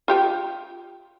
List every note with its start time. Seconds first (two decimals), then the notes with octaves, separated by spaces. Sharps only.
0.08 F4 G4 G5